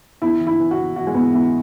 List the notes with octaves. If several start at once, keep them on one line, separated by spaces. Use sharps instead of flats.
E2 E4
E3
E4
E3
F#4
E3
E3 F#4
G#3
E3 B3
E2 E4